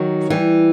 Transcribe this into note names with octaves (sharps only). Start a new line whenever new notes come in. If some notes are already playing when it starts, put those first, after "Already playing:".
Already playing: D#3 F#3
E3 G3